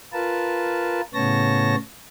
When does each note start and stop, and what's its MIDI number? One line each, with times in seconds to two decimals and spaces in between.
0.13 1.01 65
0.13 1.01 70
0.13 1.01 71
0.13 1.01 81
1.14 1.76 45
1.14 1.76 49
1.14 1.76 59
1.14 1.76 73
1.14 1.76 81
1.14 1.76 94